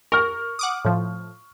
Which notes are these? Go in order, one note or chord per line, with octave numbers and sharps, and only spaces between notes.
A#4 C#6 F6
F#5 D6 D#6
A2 F3